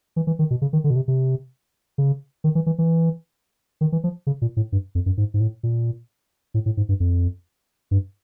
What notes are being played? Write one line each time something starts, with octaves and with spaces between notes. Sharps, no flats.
E3
E3
D#3
B2
C#3
D#3
D3
B2
C3
C3
C#3
D#3
E3
E3
E3
D#3
E3
F3
C#3
A#2
A2
G2
F2
F#2
G#2
G#2
A2
A#2
A2
A2
G#2
G2
F2
G2